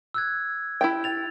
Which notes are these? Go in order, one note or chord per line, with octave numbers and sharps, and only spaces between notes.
E6 F#6 G#6
E4 G4 G5
A6 F7